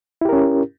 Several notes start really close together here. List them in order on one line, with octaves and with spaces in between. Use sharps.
E4 G4 A#4 C#4